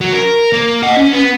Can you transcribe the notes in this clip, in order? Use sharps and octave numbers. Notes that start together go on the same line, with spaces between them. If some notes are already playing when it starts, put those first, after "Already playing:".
F#3
A#4
A#3
D#5 F#5
C#4
B3